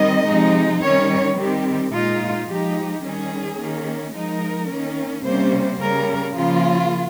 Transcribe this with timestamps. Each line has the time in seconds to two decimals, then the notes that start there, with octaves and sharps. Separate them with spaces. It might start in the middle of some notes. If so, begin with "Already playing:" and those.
Already playing: D#3 G3 C4 D#5
0.26 C3 F3 G#3 D#4
0.81 D#3 G3 C#4 C#5
1.37 D#3 G3 C4 G4
1.92 A#2 G#3 D#4 F4
2.48 F3 G#3 D#4 G4
3.03 D#3 G3 C#4 G#4
3.58 D#3 A#3 C#4
4.14 F3 G#3 D#4 A#4
4.69 D#3 A#3 C#4
5.24 C3 G3 A#3 C#4 C5
5.80 C#3 G3 C#4 A#4
6.35 C#3 F3 A#3 F4